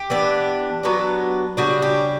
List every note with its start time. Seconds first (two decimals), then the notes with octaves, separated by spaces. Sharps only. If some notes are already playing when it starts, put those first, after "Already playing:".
Already playing: G4
0.10 E3 B3 D4
0.83 F#3 B3 D4
1.57 C#3 G3 D4 F#4
1.82 G4